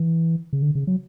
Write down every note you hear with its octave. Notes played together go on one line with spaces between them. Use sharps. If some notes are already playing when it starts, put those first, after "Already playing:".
Already playing: E3
C#3
D3
C#3
F#3